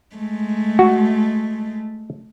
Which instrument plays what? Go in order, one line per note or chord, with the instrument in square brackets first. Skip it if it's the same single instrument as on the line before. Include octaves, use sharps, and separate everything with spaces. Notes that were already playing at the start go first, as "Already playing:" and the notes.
[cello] G#3 A3
[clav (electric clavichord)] F#4